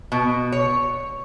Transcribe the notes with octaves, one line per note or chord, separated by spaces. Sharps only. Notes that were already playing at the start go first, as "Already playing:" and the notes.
B2
C#5